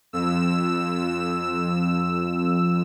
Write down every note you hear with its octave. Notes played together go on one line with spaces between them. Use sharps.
F2 E6